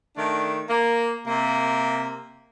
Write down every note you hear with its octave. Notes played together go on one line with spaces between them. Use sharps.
D#3 A3 D4
A#3
C3 A#3